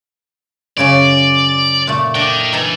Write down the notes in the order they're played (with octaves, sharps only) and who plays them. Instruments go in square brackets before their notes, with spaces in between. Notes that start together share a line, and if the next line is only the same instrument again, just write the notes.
[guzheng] F#2 C#3 C#4 [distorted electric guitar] D5
[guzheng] A#2 A3
[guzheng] D4 [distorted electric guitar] D#5 G5
[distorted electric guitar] E3 [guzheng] D#4 A4 A#4